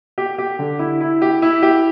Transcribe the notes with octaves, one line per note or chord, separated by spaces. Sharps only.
G4
G4
D3
E4
E4
G4
E4
G4